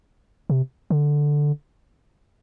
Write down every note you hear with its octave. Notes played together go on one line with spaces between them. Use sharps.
C3
D3